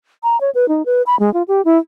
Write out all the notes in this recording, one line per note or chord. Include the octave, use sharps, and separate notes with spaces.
A#5
C#5
B4
D#4
B4
B5
G#3
F4
G4
E4